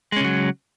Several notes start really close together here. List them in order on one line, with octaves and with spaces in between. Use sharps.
G#3 C#4 C#3 F#3